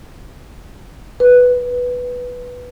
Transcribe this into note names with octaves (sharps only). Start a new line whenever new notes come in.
B4